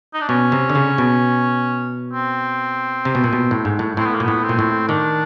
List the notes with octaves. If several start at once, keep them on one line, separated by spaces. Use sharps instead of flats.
D#4
D4
B2 C#4
C3
D3
C#3
B2
C4
C3
B2
A#2
B2
A2
G#2
A2
A2 C4
B3
A#3
A#2
A2 B3
C4
A#2
A2
D#3 D4